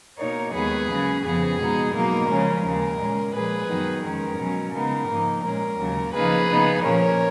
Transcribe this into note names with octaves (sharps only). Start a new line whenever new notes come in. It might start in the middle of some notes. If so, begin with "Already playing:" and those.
B2 A#3 D#4 A#4 C#5
D#2 D#3 G#3 B3 G#4 B4
C#3 F#3 C#4
F2 C#3 F3 B3 G#4
B2 G#3 B3 D#4
B2 F#3 A#3 D#4 A#4
C#3 F3 G#3 C#4
D#2 C#3 G#3 A#4
A#2 G#3 C#4
A#2 F3 G#3 G#4 B4
F#2 D#3 F#3 B3 D#4
F2 D#3 G#3 C#4 A#4
B2 F#3 C#4
C#3 G#3 B3 D#4 A#4
G#2 F3 A#3 D#4
A#2 G#3 C#4 A#4
D#2 C#3 F#3
C#3 F3 A#3 D#4 G#4 B4
C#3 F3 B3 D#4
A#2 F3 A#3 C#4 A#4 C#5